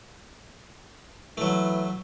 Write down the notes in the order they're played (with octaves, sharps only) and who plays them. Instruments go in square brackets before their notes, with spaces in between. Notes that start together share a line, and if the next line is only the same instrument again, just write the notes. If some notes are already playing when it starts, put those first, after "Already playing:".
[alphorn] E3 [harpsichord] F#3 A3